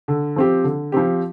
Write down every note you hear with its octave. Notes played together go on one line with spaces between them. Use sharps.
D3
F3 C4 G4
D3
F3 C4 G4